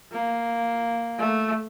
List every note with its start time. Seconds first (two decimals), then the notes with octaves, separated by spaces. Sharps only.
0.12 A#3
1.19 A3